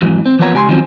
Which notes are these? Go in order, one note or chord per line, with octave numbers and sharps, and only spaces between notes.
F2 G#2 E3 F#3
C4
E3 F3 A#3 B3 C#5 A#5
C#2 G4 G#5 A#5 C6
D#3 F3 F#3 C4 C#4